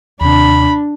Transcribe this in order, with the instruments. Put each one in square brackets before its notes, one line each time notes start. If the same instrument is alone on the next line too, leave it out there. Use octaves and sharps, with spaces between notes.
[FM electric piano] D#2 C3 [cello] D4 [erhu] B5